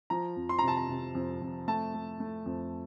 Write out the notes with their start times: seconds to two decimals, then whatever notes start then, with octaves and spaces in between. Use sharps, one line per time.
0.10 F3 A#5
0.36 F2
0.49 C6
0.59 C3 A#5
0.68 A5
0.77 A#5
0.89 C3
1.15 F2
1.41 F2
1.68 A3 A5
1.94 A3
2.20 A3
2.46 F2